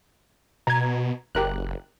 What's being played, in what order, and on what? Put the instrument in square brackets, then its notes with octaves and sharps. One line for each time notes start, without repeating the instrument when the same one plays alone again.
[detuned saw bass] B2 [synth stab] A#5 G#6
[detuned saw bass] F#1 [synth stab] G4 A#4 F#6